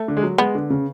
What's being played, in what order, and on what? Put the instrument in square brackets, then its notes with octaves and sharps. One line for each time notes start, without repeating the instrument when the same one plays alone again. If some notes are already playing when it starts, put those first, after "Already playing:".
Already playing: [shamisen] A3
[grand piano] D3
G#3
F#3
[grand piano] G#3 [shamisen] B3
[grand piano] D3
C#3